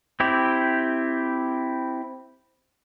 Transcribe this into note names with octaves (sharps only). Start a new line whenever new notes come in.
C4 E4 G4